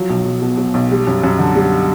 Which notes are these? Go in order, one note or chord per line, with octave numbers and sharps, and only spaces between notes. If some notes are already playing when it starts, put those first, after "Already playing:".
Already playing: F3 F#3
B1
B1
B2
F#3
B1
G3
F#2
F#2
D3
G3